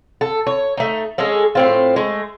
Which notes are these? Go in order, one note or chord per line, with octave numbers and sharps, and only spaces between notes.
A4
C#5
A3 D#4
G#3 C#4 G#4 A4
A2 C4 F4
G#3 A3